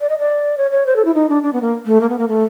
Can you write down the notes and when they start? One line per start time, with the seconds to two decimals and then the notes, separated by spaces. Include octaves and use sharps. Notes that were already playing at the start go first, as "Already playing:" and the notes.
0.01 D5
0.09 D#5
0.19 D5
0.58 C#5
0.71 C#5
0.86 C5
0.96 A4
1.05 E4
1.14 D#4
1.29 D4
1.43 D4
1.53 B3
1.62 A#3
1.86 A3
2.01 A#3
2.09 B3
2.19 A#3
2.28 A3